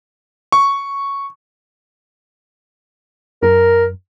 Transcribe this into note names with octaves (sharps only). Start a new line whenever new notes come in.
C#6
F#2 A#4